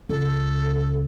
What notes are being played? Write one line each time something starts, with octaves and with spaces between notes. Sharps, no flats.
C#2 C#3 A4